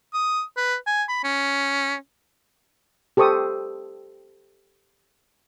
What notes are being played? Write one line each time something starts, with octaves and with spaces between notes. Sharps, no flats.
D#6
B4
G#5
B5
C#4
G4 A4 C5 C#6 D#6